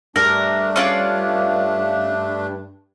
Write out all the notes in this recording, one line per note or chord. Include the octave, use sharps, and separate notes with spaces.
G2 A3 D4 A#4
C#4 F4 D5